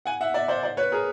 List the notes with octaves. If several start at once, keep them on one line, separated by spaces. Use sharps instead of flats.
F#5 G#5
E5 F#5
D5 E5
C5 D5
C5 D5
B4 C#5
G#4 A#4